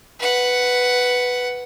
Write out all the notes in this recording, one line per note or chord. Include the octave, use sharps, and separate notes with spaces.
B4 F#5